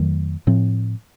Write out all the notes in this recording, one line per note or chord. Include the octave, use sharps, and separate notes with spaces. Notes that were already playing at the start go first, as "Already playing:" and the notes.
Already playing: F2 D#3 F#3 A3
A2 F3 C4